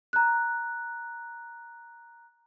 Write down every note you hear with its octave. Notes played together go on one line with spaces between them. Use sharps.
A#5 F#6